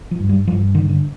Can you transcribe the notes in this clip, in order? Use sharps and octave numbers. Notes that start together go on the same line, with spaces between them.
F3
G2
G3
G2 F3
D3 D#3
D3